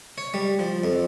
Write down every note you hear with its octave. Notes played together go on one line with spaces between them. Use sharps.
C#5
G3
F3
F2